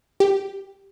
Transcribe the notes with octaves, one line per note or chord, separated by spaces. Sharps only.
G4